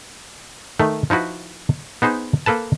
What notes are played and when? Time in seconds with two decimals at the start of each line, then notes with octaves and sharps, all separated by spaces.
0.79 D#3 A3
1.10 F3 D#4 E4 F#4 B4
2.02 B3 D#4 G#4 C5
2.46 A#3 A4 B4 A5